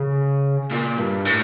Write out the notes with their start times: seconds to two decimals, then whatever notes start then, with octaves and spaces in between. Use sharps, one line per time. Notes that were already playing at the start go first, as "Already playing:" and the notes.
Already playing: C#3
0.71 A#2
0.98 G2
1.25 A2